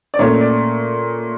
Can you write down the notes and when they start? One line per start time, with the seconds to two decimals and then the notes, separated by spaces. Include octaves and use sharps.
0.14 D5
0.19 A#2 A3 C#4 C#5
0.41 D5